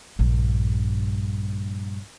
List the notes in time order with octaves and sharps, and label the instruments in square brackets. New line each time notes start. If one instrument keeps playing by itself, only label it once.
[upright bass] A#1 G2